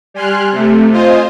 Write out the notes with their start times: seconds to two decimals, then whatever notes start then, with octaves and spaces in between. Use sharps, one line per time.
0.14 G3 G#5 C6 F6 F#6
0.52 C3 A3
0.92 F4 C5 D#5 G#5